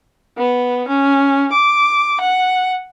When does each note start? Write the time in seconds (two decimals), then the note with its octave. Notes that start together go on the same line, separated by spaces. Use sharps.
0.38 B3
0.88 C#4
1.52 D6
2.20 F#5